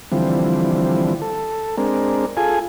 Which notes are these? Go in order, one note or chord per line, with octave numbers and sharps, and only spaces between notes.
D3 E3 F3 G3 C4
A4
G#3 C4 D4 A#4
F4 G#4 A4 G#5